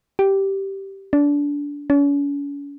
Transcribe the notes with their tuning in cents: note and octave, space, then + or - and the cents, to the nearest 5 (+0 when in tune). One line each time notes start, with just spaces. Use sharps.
G4 -10
D4 -25
C#4 +40